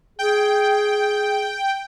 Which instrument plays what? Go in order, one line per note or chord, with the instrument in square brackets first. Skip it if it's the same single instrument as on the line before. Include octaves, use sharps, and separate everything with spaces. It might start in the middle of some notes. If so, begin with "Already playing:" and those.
[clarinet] G#4 [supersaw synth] G5